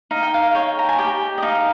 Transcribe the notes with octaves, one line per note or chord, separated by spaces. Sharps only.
D#4 F5
G5
F5
C#5 G5
A#5
G#5
G4 G5
D#5
D#4 F5